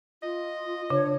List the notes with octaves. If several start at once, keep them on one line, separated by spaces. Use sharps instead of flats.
F4 D#5
C#3 D4 C#5